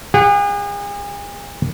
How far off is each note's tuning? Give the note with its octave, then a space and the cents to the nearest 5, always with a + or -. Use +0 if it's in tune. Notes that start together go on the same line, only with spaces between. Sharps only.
G#4 -40 F#5 +0